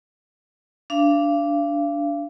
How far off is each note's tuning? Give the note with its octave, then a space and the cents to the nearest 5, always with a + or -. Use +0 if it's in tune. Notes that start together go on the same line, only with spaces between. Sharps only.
D4 -10 F5 -35